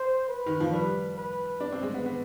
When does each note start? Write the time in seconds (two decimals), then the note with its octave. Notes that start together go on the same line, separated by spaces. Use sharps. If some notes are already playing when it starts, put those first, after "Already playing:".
Already playing: C5
0.29 B4
0.46 D#3
0.60 F3
0.72 G3 B4
1.18 B4
1.61 D4
1.72 C4
1.83 G#3
1.94 B3
2.06 B3